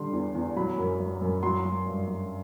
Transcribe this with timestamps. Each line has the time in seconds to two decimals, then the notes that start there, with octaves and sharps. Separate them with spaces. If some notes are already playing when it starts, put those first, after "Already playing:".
Already playing: D3 G3 C6
0.13 E2
0.35 E2
0.56 F#3 B5
0.78 F#2
1.00 F#3
1.22 F#2
1.43 F#3 C6
1.65 F#3
1.86 G2
2.08 F#3